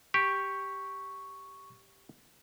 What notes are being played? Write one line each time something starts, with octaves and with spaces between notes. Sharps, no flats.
G4 C#6